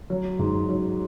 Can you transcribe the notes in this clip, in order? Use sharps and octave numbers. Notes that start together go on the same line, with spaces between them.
F#3
G#2
F#3